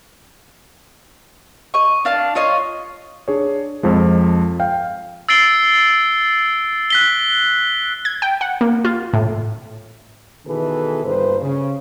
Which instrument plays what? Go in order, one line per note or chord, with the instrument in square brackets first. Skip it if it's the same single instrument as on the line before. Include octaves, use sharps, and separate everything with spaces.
[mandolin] D#5 C#6
D4 F5 A5
F4 C#5 D#5 F5
[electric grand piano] D4 G#4 C#5
F2 F3 G#3
F5 G5
[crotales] E6 A6 C7 D7 G7
F#6 B6 G7
[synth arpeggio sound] G#6
G5
F#5
A#3
F4
A2
[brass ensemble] B2 D#3 E3 G#4 A4 B4
G1 G2 A#2 B4 C5
C#3